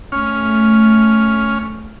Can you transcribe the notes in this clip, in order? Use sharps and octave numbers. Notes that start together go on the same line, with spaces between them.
A3 C#4 F6